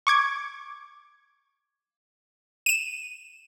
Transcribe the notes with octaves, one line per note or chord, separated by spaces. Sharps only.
C#6 D6 G#6
D#7 E7